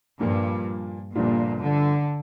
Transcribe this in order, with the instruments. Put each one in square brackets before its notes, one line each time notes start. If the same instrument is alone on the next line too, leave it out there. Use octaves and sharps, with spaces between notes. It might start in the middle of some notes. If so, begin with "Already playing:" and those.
[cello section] G2 [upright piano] A#2 F3 A#3
[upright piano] G1 G2 F3 D4 F4 [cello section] A#2
[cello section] D3